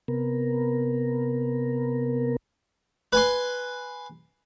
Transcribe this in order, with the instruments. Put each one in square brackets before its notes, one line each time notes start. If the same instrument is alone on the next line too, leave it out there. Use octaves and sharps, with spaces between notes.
[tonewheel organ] C3 B3 A#4
[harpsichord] B4 G#5 C6